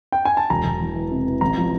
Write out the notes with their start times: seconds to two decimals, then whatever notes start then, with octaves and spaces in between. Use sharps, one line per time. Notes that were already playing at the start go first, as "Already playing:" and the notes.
0.12 G5
0.25 G#5
0.37 A5
0.50 E1 A#5
0.65 E1
0.81 E2
0.95 E3
1.11 C3
1.26 E3
1.41 A1 A#5
1.57 F3